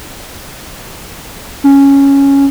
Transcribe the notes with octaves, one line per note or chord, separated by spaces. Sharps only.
C#4